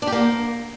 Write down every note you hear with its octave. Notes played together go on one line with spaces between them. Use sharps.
D4
G4
A#3